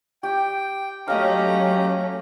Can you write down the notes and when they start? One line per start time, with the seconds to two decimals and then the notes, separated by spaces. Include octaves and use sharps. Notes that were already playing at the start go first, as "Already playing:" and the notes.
0.23 G4 G5
1.08 F#3 A3 C#4 G4 D#5 F5 A#5